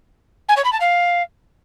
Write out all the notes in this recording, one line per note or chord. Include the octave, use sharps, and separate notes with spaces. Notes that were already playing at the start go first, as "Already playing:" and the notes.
G#5
C#5
B5
A5
F5